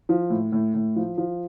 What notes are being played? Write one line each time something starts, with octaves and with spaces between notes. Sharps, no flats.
F3
A2
A2
A2
F3
F3